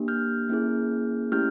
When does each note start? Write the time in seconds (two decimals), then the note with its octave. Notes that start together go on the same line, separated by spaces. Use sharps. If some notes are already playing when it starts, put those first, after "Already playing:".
Already playing: A#3 D4 G4
0.08 F6 G6
0.49 A#3 C#4 E4 G#4
1.32 A3 C#4 E4 G4 F6 G6